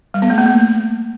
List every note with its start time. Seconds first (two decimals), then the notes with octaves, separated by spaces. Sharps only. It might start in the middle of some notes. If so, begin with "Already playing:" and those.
0.14 G3
0.22 B3
0.30 A3
0.38 A#3
0.46 A3